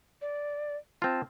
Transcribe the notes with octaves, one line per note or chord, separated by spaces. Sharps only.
D5
C4 F4 A5